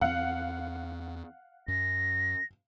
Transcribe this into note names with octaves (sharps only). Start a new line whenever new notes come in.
E2 A3 C4 F5 F#5
F#2 A#6